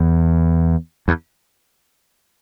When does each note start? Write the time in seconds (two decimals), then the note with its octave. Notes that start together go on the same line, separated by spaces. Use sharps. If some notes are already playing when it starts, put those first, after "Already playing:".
Already playing: E2
1.08 E2